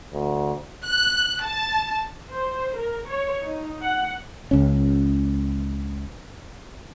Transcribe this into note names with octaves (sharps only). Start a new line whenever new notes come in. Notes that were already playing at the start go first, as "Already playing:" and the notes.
D2
F#6
A5
C5
A#4
C#5
D#4
F#5
C#2 C#4